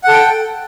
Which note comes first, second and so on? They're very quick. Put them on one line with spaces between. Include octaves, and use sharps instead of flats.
F#5 A4 G5